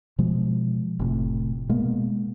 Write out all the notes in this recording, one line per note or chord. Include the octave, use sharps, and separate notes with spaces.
B2 F3 G#3
F1 A2 C3
B2 G#3 A#3 B3